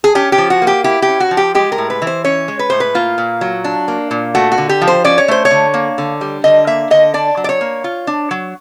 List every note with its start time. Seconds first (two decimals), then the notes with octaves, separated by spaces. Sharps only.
0.04 G#4
0.15 C#4 G4
0.32 G4
0.38 F3
0.50 F#4
0.62 A#3
0.67 G4
0.84 E4 G4
1.02 G4
1.08 C#4
1.20 F#4
1.31 F3
1.37 G4
1.55 G#3 G4
1.72 A#4
1.78 A2
1.90 B4
2.02 E3
2.07 C5
2.24 C#4 C#5
2.48 G#3
2.59 B4
2.70 A2 C5
2.80 B4
2.95 A#3 F4
3.18 A#2
3.41 F#3
3.64 D4
3.88 A#3
4.11 A#2
4.35 A3 F#4
4.52 F#4
4.58 D3
4.69 G4
4.82 F3
4.87 C5
5.04 C#4 D5
5.18 C#5
5.28 A3 C5
5.45 C#5
5.51 D3
5.74 A#3
5.98 D3
6.21 G3
6.44 D3 D#5
6.67 A#3 E5
6.91 D3 D#5
7.14 D4 D5
7.37 F#3
7.44 D5
7.49 C#5
7.61 A#3
7.84 F4
8.07 D4
8.31 F#3